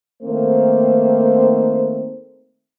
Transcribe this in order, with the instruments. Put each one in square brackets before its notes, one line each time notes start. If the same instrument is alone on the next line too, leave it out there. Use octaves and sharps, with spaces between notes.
[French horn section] D#3 A3 A#3 C4 C5